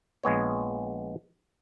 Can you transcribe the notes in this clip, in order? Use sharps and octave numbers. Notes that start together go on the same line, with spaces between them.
A#1 G#3 B3 C#5